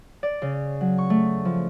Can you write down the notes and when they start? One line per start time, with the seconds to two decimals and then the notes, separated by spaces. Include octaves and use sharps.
0.23 D5
0.42 C#3
0.81 F#3
0.98 C#6
1.10 A3
1.45 F3